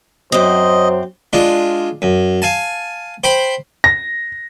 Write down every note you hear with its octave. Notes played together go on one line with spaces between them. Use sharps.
F#2 F#3 C4 C5 D#5
G#3 D4 F4
F#2
F5 G#5 A5
C5 G5 B5 C6
A#6